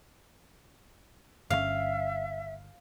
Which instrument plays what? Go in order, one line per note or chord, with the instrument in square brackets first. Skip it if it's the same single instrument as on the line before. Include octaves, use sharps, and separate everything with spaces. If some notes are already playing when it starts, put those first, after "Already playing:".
[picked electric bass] G1 D3 C#4 [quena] E5 [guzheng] F5